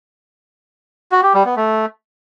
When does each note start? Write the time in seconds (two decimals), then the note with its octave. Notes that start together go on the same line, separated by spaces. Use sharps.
1.12 F#4
1.23 G4
1.34 G3
1.45 B3
1.57 A3